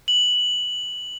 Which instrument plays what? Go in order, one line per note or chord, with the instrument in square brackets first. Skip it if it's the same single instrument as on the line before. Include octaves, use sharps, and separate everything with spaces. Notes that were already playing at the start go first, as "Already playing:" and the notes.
[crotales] F#7